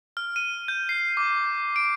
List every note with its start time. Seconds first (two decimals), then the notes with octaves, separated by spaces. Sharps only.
0.17 F6
0.36 D#7
0.68 G6
0.89 C7
1.17 D6
1.76 D7